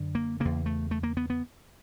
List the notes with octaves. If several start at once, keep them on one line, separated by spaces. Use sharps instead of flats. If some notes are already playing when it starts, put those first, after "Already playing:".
Already playing: F#2 D3
A#3
E2 C#3 A#3
A3
A3
A#3
B3
B3